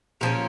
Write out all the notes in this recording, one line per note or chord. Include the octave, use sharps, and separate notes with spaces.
A#2 F3 C#4 A#4